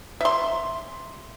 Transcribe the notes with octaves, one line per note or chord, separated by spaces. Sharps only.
E5 C6